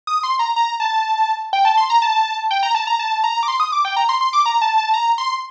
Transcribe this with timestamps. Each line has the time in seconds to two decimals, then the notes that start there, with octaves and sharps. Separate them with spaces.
0.07 D#6
0.23 C6
0.39 A#5
0.56 A#5
0.80 A5
1.53 G5
1.65 A5
1.77 C6
1.90 A#5
2.02 A5
2.51 G5
2.63 A#5
2.75 A5
2.87 A#5
2.99 A5
3.24 A#5
3.43 D6
3.48 C6
3.60 D#6
3.72 D6
3.85 G5
3.97 A#5
4.09 C6
4.21 C6
4.33 D6
4.46 A#5
4.62 A5
4.78 A5
4.94 A#5
5.18 C6